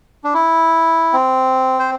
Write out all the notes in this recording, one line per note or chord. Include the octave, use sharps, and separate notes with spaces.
D4
E4
C4
C5